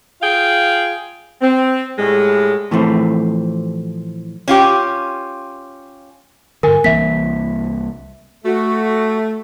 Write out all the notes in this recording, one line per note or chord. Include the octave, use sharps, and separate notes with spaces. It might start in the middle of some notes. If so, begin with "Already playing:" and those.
F4 G#4 F5 G5
C4
A2 G3 G#3
A2 E3 F3 A3 C4
C#4 F4 G4
G2 D3 A#4 G#5
C2 E3 A#3 E5 B6
A3 F#4